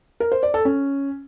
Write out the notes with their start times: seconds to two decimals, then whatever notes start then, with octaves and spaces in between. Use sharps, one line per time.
0.20 A#4
0.32 C5
0.43 D5
0.54 A4
0.65 C#4